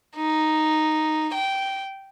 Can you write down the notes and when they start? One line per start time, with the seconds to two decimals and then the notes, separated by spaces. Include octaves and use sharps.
0.16 D#4
1.34 G5